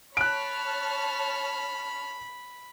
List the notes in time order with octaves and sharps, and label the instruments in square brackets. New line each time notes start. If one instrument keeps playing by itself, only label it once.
[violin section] C#5 A5 F6 [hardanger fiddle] B5 [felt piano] F#6 D7